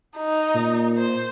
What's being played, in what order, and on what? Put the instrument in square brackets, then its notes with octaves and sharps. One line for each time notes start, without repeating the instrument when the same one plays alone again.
[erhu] D#4
[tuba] A#2
[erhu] C5